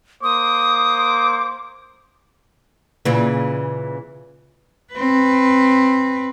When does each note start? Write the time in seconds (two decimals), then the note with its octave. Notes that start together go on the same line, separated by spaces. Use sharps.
0.23 A#3 C5 D6 D#6
3.05 A#2 C#3 E3
4.93 C4 B4